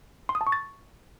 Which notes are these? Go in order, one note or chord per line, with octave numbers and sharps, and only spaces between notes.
C6
D#6
A5
C#6
A6